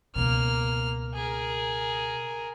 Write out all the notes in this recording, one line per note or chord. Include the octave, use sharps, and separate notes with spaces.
C#2 B2 A#3 F6
G#4 A#4